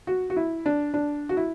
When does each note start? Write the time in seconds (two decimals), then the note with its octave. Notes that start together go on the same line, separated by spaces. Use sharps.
0.07 F#4
0.30 F#4
0.36 E4
0.66 D4
0.94 D4
1.29 F#4
1.37 E4